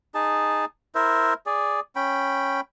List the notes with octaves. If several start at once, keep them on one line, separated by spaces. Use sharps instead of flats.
D#4 G#4 A5
E4 A#4 C5 E5
G#4 D5
C#4 G5 B5